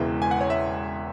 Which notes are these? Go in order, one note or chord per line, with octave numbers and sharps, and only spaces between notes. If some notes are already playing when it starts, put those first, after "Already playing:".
Already playing: E1 E2 C#3 E3 G#3 E5
G#5
F#5
C#5
E5